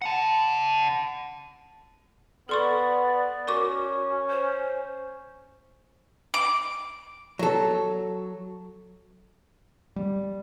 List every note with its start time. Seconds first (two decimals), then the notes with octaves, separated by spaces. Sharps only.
0.02 F#5 A5
2.49 B3 A4 D5 C6 C#6
3.47 C#4 F#4 A#4 C#6 D6
4.30 C5
6.34 D6
7.39 F#3 A4
9.96 G3